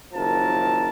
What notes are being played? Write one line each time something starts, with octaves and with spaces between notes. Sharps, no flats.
F#1 D#3 F3 A#4 A5